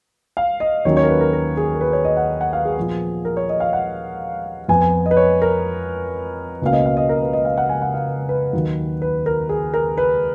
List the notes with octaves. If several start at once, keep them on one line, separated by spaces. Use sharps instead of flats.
F5
D#5
D#2 D#3 F#3 C#4 C#5
C#5
A#4
B4
A#4
A#4
G#4
A#4
B4
C#5
D#5
F#5
F#5
F5
G#4
A#2 F3 B3
A#4
C#5
D#5
F5
F#5
F2 F3 B3 G#5
G#5
D#5
B4
C#5
A#4
C#2 B2 A#3 C#4 F5
D#5
F5
D#5
A#4
B4
D#5
F5
F#5
G#5
F#5
F5
B4
D#2 D#3 F#3
B4
A#4
G#4
A#4
B4